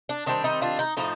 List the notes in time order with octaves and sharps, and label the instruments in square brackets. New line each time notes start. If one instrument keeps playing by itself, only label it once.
[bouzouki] D4
D#3 G3 C4 D4
D#4
D4 F4
D#4
A2 F3 A3 D#4